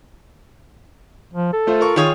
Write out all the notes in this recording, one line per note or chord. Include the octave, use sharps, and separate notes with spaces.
F3
A4
A3 F4 C5
F4 A#4 C#6
D#3 F4 G#4 C#5 D#6